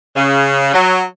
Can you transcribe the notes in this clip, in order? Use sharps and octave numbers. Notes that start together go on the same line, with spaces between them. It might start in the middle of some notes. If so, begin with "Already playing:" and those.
C#3
F#3